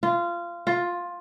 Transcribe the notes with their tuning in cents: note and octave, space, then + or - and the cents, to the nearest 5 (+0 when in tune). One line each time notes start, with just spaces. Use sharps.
F4 -20
F4 +10